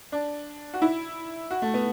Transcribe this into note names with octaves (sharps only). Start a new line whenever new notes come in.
D4
F#4
E4
F#4
A3
B3